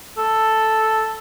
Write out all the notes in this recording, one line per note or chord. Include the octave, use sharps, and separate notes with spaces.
A4